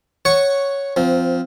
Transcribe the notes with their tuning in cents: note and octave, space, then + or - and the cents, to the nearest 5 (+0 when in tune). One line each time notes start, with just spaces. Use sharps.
C#5 +0 F#5 +0 C#6 +0
F3 +0 C4 -15